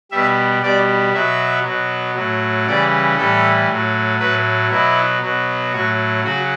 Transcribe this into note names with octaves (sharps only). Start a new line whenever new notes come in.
B2 G3 E5
B2 G3 D5
B2 F#3 E5
B2 F#3
A2 F#3
C#3 E3 G3 D5
A2 E3 G3 A4
A2 F#3
A2 F#3 B4
B2 F#3 E4
B2 F#3
A2 F#3 F#4
C#3 F#3 F#4